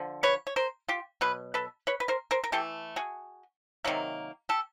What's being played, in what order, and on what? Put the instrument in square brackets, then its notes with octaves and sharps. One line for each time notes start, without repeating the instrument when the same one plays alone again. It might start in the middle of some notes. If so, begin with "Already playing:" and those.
Already playing: [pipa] D3 F3
B4 C#5
C#5
A#4 C5
F4 G4
B2 F#3 B4
A4 B4
B4 C#5
B4
A#4 C5
A#4 C5
A#4
E3 A3 G4 A4
F#4 G#4
C3 D#3 F#3 A#3
G4 A4